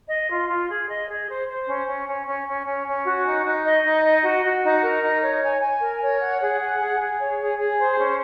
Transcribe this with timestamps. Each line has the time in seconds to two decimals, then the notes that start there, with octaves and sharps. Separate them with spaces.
0.09 D#5
0.30 F4
0.49 F4
0.69 G#4
0.89 D#5
1.08 G#4
1.28 C5
1.48 C5
1.67 C#4
1.87 C#4
2.07 C#4
2.27 C#4
2.46 C#4
2.66 C#4
2.86 C#4
3.05 F#4
3.26 D#4
3.44 D#4
3.65 D#5
3.84 D#4
4.04 D#5
4.23 F#4
4.44 F#4
4.63 D#4
4.83 A#4
5.03 D#4
5.22 C#5
5.42 G#5
5.61 G#5
5.80 A#4
6.01 C#5
6.21 F#5
6.40 G#4
6.60 F#5
6.79 G#4
6.99 G#4
7.19 C#5
7.39 G#4
7.58 G#4
7.78 C5
7.97 C#4